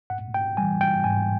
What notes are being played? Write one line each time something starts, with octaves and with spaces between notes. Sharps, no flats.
G#2 F#5
G5
E3 G3 G#5
G5
G#2 G#5